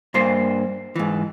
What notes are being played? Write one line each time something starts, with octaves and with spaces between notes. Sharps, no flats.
G2 A#3 C5 C6
G#2 E3